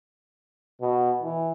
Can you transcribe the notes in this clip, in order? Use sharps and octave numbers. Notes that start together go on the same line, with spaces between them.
B2
E3